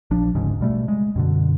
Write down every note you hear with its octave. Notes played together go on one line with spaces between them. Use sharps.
A#1 F3 D4
G1 D2 G#2 C#3
B2 G3 A3
G#3
F#2 B2 D3